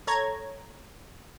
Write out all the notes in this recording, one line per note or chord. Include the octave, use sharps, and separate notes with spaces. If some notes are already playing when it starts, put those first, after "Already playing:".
A4 C#5 A#5 G#6